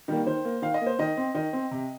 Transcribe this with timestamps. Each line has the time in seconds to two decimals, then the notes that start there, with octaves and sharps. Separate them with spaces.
0.08 D#3 G3 A#3
0.26 D#3 C5
0.45 A#3
0.62 D#3 F5
0.74 D#5
0.81 A#3
0.86 C5
0.99 D#3 D#5
1.17 C4
1.34 D#3 D#5
1.53 C4
1.71 C3